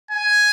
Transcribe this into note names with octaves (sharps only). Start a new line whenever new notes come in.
G#5